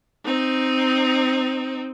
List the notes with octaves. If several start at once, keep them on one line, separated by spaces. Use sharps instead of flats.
C4 D#4